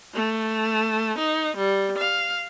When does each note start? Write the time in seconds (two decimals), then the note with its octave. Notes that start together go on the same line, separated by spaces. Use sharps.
0.14 A3
1.18 D#4
1.57 G3
1.98 F5